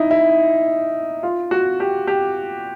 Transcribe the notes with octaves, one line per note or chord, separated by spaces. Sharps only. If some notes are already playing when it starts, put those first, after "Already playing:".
Already playing: D#4 E4
E4
F4
F#4
G4
G4